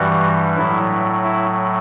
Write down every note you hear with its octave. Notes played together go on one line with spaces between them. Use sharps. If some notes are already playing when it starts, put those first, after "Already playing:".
Already playing: G2 E3 G3 F#4
A2 F#3 E4
E4